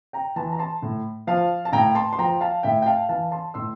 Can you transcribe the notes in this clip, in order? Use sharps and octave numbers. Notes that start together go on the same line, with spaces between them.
G5 A#5
E3 A5 C6
A#5
A5 C6
A2
F3 F5 A5
A5
A2 G5 A#5
A5 C6
C6
F3 G5 A#5
F5 A5
A2 E5 G5
G5
F5 A5
E3 F5 A5
A5 C6
A2 C6 E6